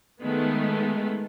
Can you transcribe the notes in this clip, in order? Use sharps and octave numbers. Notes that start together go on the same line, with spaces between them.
D#3 G#3 A3 B3